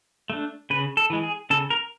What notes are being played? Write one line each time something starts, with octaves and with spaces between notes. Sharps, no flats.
A3 D4
C#3 B4
A4
E3 G#3
G#4
C#3 A4
A#4